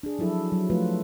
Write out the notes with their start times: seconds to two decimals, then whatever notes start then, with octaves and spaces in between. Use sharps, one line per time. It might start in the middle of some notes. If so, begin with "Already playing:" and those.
0.03 D4 G#4
0.19 F3 F#3 E4 A4
0.52 F#3
0.70 F3 A3 F4 B4